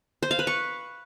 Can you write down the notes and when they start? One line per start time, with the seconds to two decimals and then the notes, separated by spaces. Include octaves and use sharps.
0.23 C5
0.31 F5
0.39 B4
0.47 C#6